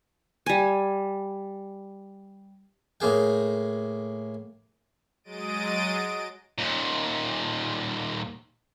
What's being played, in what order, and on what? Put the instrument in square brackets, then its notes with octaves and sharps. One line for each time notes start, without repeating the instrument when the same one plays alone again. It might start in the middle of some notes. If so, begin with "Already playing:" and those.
[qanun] G3 G#5
[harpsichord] A2 A#3 G#4 G5
[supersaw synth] F#3 G#3 D#5 A6 D7 D#7
[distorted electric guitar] D#2 A#2